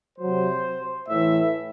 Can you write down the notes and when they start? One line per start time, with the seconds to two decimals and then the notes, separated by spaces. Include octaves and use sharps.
0.18 C3 F#3 C5
1.08 A2 E3 E5